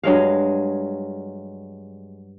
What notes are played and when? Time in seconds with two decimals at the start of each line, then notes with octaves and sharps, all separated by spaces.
0.04 G2 F#3 G#3 F5